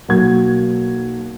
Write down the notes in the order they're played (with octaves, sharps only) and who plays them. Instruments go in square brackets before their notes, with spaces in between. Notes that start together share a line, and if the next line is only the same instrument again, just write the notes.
[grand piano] B1 A#3 F#4 G#6